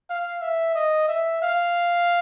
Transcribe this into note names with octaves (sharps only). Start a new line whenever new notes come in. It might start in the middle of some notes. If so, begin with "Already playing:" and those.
F5
E5
D#5
E5
F5